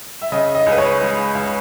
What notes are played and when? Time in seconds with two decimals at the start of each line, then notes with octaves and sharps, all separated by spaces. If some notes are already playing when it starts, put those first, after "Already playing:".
0.22 E5
0.32 C#3 D#5
0.55 D#5
0.66 C#2
0.71 B4
0.78 C#5
1.01 G#3
1.35 C#2